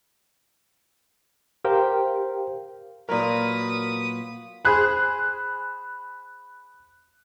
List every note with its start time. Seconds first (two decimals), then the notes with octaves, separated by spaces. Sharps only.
1.65 G4 A#4 C5 F5 G5
3.09 A#2 F#3 A#4 B4 D5 D#6
4.65 G#4 C5 B5 F#6